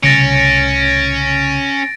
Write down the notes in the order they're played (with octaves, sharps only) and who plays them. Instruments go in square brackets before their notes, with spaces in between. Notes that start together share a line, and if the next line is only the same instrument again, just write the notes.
[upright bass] C2 A2 [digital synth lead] C#3 [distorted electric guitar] C#4 [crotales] A6 A#6 D7